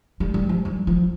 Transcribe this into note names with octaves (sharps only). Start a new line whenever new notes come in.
G3
G3
F3
G3
F3